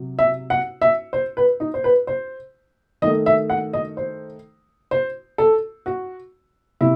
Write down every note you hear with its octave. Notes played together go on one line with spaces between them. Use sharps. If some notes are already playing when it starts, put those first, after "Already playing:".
Already playing: C3 F#3
E5
F#5
E5
C5
B4
D#4
C5
B4
C5
D#3 A3 D#5
E5
F#5
D#5
C5
C5
A4
F#4
C3 E4